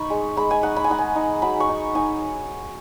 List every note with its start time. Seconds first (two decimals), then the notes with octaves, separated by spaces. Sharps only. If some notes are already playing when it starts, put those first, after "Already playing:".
Already playing: D#4 B5 C#6
0.10 G#3
0.37 G#3 B5
0.51 G#5
0.63 D#4 F#5
0.76 B5
0.84 G#5
0.90 D#4 F#5
0.98 G#5
1.15 D#4
1.42 F#3 B5
1.60 C#6
1.69 D#4
1.95 D#4 G#5